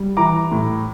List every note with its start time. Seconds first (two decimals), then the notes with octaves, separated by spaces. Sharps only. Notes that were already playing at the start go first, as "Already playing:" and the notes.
Already playing: G3
0.17 E3 A#5 D6
0.52 A2